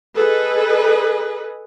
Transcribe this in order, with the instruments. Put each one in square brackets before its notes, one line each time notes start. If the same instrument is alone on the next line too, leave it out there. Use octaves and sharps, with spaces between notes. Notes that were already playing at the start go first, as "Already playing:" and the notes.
[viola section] G#4 A4 B4 D#5